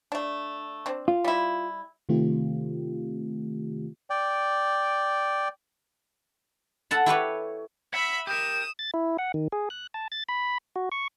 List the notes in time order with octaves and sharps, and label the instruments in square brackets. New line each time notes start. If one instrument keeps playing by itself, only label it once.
[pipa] A3 D4
C4 D4
[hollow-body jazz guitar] F4
[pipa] G3 E4
[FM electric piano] C3 D#3 A3 C4 F4 G4
[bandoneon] D5 G5
[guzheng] A4 F#5 A5 B5
E4 G4 B4 C#5
[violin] E5 B5 [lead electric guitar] F#5
[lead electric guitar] G4 A#4 [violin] D#6 E7
[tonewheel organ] A6
E4
F#5
D#3
G#4
F#6
A5
A6
B5
F#4
C#6